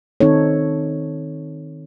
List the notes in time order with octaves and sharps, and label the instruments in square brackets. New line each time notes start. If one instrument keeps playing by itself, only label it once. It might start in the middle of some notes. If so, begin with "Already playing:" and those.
[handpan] D#3 C4 D#4 A4 C#5